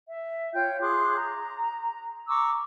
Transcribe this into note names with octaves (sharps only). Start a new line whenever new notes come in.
E5
F4 C#5 G5 G6
G#4 C6 D6 F#6
A#5
A#5 C#6 D6 E6